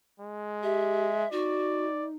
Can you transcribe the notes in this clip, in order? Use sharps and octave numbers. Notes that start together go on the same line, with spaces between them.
G#3
G4 E5
D#4 F#4 D5